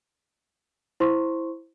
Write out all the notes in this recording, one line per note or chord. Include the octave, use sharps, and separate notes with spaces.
E4 C5 C6 C#6